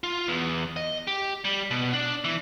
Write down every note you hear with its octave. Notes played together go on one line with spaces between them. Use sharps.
F4
E2
D#5
G4
G3
B2
D4
E3